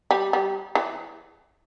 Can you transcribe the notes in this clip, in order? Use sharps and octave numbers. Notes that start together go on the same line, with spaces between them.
G3
G3
E3